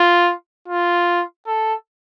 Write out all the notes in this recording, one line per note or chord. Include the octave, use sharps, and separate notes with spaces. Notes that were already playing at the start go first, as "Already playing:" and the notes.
Already playing: F4
F4
A4